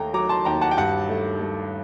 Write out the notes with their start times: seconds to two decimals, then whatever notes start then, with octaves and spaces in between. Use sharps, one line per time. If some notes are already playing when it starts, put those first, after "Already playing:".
Already playing: D#2 A3 G5 A#5
0.14 F#3 A#5 D6
0.29 A5 C6
0.45 D#2 G5 A#5
0.61 F#5 A5
0.71 G5
0.77 G2 F#5 A5
1.09 A3
1.41 A3